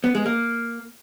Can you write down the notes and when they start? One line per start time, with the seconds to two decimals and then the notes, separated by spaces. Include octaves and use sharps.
0.04 B3
0.15 G#3
0.26 A#3